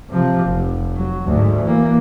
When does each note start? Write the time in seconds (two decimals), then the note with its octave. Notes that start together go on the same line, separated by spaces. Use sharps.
0.10 C3 F3
0.45 F1
0.96 F#3
1.26 D2 G#2
1.62 E3 A#3